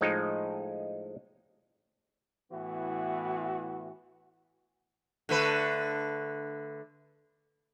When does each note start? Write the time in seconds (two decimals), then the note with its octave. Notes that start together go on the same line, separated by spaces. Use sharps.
0.01 A2 F3 G#3 D#4
2.51 A2 E3 B3 F#4
5.29 D3 A3 B4